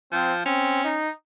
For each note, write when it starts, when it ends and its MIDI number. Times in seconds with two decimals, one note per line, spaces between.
0.12 0.41 53
0.12 0.32 60
0.45 0.79 60
0.45 0.97 61
0.84 1.09 63